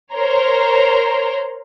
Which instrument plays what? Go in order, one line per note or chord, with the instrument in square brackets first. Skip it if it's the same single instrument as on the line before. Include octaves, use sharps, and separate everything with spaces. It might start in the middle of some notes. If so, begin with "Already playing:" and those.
[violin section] A#4 C5 C#5 A#5 C6